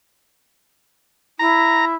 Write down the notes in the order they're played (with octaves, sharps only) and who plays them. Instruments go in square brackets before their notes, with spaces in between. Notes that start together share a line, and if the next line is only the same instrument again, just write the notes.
[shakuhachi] E4 [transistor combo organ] A#5